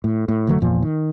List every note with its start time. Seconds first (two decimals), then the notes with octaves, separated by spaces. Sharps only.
0.04 A2
0.28 A2
0.47 F1 D3 F#3 A3
0.60 G1 E2 A#2 F3
0.82 D#3